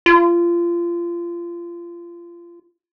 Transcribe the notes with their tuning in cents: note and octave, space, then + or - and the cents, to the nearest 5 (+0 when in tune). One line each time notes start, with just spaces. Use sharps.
F4 -25